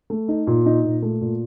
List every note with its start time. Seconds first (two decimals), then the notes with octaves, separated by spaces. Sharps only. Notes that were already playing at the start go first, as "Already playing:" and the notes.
0.10 A3
0.28 D#4
0.47 A#2
0.66 D#4
0.84 A#2
1.02 A3
1.21 A#2